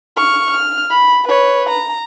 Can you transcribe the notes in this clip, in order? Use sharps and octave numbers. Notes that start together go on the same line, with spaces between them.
C#6 F6
F6
B5
B4 C#5
A#5